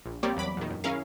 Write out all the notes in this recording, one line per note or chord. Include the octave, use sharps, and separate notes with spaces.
A#1
G3 A#3 C4 G4 C#5 D5
E2 F#3 B5 D6
E2 A#2 D#3
F#2
C#4 E4 G#4 A#4 F5